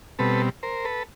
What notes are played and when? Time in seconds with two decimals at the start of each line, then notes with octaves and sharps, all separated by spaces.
0.19 B2 G3 C4 A4 B4
0.63 A#4 C5
0.85 A4 B4